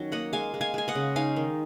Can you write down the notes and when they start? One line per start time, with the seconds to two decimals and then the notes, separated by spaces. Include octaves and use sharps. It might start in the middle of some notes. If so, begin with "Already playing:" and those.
Already playing: D#3 F#3 C#4
0.12 A#3 D#5 F#5
0.33 G#3 F5 G#5
0.54 G#3
0.61 F5 G#5
0.74 G#3 G#5
0.88 D#5 F#5
0.95 C#3
1.16 D#4 F5 G#5
1.36 D#3